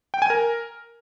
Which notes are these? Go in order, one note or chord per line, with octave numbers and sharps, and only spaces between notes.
G5
G#5
A#4